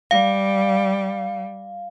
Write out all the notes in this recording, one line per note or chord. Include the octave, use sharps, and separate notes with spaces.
G3 F5